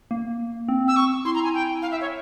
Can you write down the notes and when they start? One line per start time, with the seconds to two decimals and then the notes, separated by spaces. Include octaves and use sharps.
0.11 A#3
0.68 C4
0.88 E6
0.96 C#6
1.25 E4 C6
1.35 A#5
1.44 G#5
1.54 G5
1.82 F5
1.91 E5
2.01 C#5